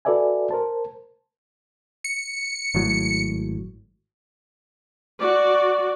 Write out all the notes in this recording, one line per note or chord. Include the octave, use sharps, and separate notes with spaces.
F#4 A4 B4 D5 E5 G#5
A#4 C5 A5
C#7
G#1 A2 F#3
F#4 D5